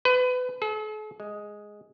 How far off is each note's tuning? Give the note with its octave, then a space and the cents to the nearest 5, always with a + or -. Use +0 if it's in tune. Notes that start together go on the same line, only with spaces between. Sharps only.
B4 +30
A4 -45
G#3 +0